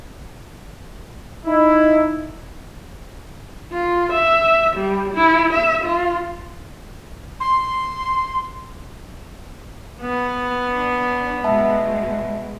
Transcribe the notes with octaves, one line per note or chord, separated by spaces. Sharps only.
D#4 E4
F4
E5
G3
E4
E5
F4
C6
B3
D4
G2 B2 G#3 E5 A5